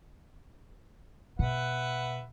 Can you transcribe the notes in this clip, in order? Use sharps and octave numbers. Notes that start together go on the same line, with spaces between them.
B2 B4 E5 F#5